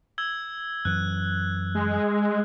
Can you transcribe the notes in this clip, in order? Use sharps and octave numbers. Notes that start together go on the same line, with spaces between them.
E6 G#6 G7
F#2 E3 F#6
G#3